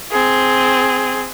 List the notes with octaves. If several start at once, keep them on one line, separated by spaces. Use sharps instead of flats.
C4 G#4